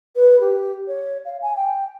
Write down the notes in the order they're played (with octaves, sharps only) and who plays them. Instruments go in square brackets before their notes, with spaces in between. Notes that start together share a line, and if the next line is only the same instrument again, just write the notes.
[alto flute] B4
G4
C#5
F5
G#5
G5